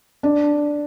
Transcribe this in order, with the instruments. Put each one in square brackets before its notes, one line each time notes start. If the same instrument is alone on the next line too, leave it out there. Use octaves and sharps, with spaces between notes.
[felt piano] D4